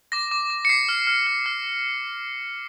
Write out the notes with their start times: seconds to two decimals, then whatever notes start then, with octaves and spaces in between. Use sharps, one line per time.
0.12 D6 A#6
0.31 D6
0.50 D6
0.65 C#7
0.69 D6 C7
0.89 F6
1.07 F6
1.27 F6
1.46 F6